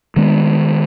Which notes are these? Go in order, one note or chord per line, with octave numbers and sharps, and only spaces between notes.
D#3 G#3 B3 D4